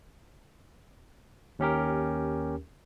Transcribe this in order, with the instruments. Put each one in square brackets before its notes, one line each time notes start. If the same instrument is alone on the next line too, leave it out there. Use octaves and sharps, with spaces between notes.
[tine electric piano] D#2 C#4 G4 A#4